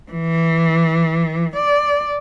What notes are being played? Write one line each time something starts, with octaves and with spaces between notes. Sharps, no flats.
E3
D5